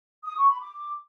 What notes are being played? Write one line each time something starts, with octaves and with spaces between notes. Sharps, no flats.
D#6
C#6
B5
D6